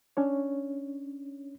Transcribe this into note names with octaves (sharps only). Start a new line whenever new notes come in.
C#4 D4 C#5